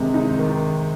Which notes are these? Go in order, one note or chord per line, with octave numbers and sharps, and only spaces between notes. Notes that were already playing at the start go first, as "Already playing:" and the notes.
Already playing: C3 D#3 G#3
D#4
D#3